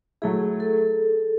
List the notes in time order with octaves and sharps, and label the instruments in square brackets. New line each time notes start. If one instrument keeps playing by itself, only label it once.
[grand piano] F#3 A3 E4 [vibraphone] G#4
[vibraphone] A4